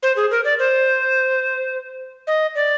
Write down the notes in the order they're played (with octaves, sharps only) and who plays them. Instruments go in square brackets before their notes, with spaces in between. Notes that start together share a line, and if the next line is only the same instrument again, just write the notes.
[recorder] C5
G#4
A#4
D5
C5
D#5
D5